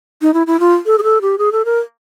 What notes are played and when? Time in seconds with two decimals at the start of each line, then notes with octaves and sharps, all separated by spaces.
0.22 D#4
0.34 E4
0.47 E4
0.60 F4
0.86 A4
0.98 G#4
1.03 A4
1.22 G4
1.38 G#4
1.52 A4
1.65 A#4